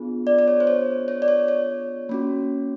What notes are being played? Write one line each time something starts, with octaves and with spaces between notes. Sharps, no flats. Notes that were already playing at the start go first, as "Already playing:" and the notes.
Already playing: B3 D4 F4 G#4
D5
D5
C#5
C5
C#5
C#5
D5
C#5
C#5
A#3 C#4 F#4